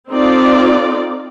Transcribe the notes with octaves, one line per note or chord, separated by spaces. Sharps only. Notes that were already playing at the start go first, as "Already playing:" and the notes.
C4 D#4 F4 A4 D5